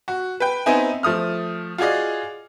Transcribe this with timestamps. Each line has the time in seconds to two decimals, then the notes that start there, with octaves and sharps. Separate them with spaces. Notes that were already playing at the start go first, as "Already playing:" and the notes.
0.08 F#4
0.40 B4 G5
0.66 B3 C4 D#4 E4 G#5
1.03 F3 A3 D#6 F6
1.78 F4 F#4 G#4 D5 D#5